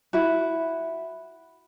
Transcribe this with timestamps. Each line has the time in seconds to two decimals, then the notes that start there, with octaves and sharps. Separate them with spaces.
0.13 E4 F#4